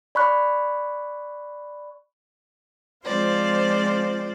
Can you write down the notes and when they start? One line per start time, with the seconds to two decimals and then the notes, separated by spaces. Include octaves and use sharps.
0.15 D5 B5 C#6 F#6
3.05 F3 G#3 C4 F4 C5 D5